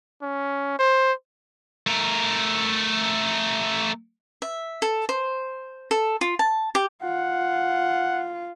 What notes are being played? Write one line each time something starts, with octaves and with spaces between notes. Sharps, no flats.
C#4
C5
A3 A#4
E5
A4
C5
A4
F4
A5
G4
F4 F#5